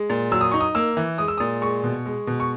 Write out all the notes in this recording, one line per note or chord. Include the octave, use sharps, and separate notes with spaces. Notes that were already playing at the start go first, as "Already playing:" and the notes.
Already playing: G#3
A#2
F#3 E6
D#6
D#4 C#6
D#6
A#3 E6
E3
G#3 D#6
E6
A#2 D#6
G#3 C#6
B2
G#3
B2
C#6